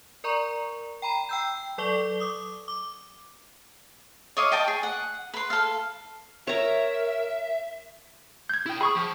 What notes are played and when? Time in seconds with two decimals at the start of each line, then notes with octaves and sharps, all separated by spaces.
0.24 A#4 D5 A#5 C#6
1.02 G5 A#5 B5
1.29 G5 E6 G6
1.78 F#3 A4 D5 C#6 G7
2.20 D6 D#6
2.68 D6
4.37 C#5 D#5 F5 D6
4.52 D#5 G5 A5 C#6
4.68 G#4
4.83 F#5
5.34 B4 C6
5.50 A4 F5
6.47 A#4 C#5 E5 A#5
8.49 G6 G#6
8.66 E4 G5
8.81 G#4 B5 C#6 D#6
8.95 F3